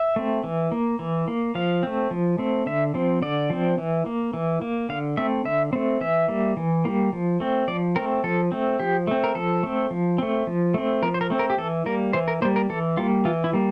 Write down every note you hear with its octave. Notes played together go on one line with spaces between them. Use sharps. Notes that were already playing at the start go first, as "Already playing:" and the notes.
Already playing: E5
A3 C4
E3
A#3
E3
A#3
F3 F5
A3 C4
F3
A3 C4
D3 E5
F3 C4
D3 D5
F3 C4
E3
A#3
E3
A#3
D3 F5
A3 C4 E5
D3 E5
A3 C4
E3 E5
G3 A#3
E3
G3 A#3
F3
A3 C4
F3 D5
A3 C4 A#4
F3 A4
A3 C4
F3 G4
A3 C4
A#4
F3 A4
A3 C4
F3
A3 C4
F3
A3 C4
F3 A#4
C5
A#4
A3 C4
A#4
G4
E3 A4
G3 A#3 A#4
E3 C5
A#4
G3 A#3 C5
A#4
E3 A4
G3 A#3 F4
E3 F4
E4
G3 A#3